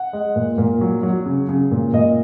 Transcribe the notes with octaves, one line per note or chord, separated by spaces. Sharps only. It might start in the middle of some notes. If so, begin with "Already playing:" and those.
Already playing: F#5
G#3
A#2
A#2
F#3
F#3
C#3
C#3
A#2
A#2 D#5